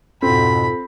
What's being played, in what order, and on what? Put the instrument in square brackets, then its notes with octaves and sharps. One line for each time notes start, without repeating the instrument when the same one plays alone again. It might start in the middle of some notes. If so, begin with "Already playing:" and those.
[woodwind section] F2 G#2 B2 [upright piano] C4 [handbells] F4 A4 [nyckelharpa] B5